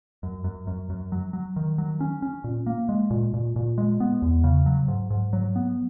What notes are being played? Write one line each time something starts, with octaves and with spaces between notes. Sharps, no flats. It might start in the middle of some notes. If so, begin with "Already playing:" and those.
F#2
F#2
F#2
F#2
F#3
F#3
D#3
F#3
C#4
C#4
A#2
A#3
G#3
A#2
A#2
A#2
G#3
B3
E2
C#3
F#3
G#2
G#2
F#3
B3